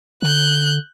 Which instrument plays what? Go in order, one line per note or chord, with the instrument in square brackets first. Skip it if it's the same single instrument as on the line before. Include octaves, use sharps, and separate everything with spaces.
[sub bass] D3 [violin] F#6 G6